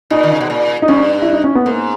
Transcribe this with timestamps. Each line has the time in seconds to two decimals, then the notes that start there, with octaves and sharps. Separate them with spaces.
0.10 A#2 D#4
0.23 D#3
0.32 C#3
0.41 B2
0.50 A#2
0.82 D#4
0.88 G2 C#4
1.22 E4
1.33 D#4
1.44 C#4
1.55 B3
1.65 G#2 A#3